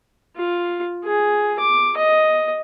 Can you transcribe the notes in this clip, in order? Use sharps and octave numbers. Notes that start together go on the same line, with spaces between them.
F4
G#4
D6
D#5